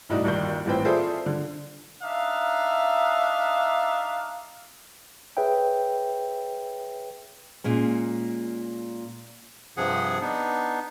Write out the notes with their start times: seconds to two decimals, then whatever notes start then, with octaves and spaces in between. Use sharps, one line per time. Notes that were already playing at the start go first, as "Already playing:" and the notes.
0.09 C2 A2 D#4 F#4 D5
0.24 G1 D#2 D#3 D5 C#6 G6
0.66 D#1 A1 C4 B4 C5 G5
0.85 F4 G#4 A4 C5 D5 E5
1.26 D3
2.03 D4 D#4 E5 F5
5.37 G#4 B4 C#5 E5 G5
7.64 A#2 G#3 C#4
9.77 G2 C3 F3 G#4 F#5
10.21 B3 D4 D#4